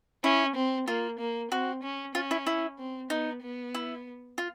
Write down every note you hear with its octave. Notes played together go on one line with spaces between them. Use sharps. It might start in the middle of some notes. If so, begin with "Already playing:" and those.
C#4 E4
C4
A#3 F4
A#3
C4 F#4
C#4
C#4 F4
E4
E4
C4
B3 D#4
B3
E4
F4